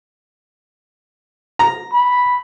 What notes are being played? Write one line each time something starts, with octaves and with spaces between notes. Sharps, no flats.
A#5
B5